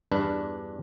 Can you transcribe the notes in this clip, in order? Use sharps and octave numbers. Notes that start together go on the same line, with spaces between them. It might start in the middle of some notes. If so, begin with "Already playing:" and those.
E2 G2 D4 B4